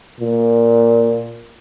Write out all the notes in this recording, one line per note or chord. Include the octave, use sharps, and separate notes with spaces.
A#2